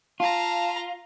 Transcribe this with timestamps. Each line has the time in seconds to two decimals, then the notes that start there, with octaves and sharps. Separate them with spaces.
0.20 F4 F5 A5 A#5